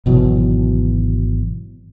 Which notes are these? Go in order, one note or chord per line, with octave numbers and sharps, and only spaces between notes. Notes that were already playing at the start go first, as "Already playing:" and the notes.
G#1 B2 E3 F#3